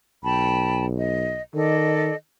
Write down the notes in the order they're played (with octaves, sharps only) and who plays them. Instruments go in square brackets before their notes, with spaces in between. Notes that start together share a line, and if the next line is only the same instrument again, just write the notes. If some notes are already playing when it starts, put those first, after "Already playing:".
[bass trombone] B1 [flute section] G5 A5 B5
[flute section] D#5
[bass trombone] D#3 [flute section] A4 D5 D#5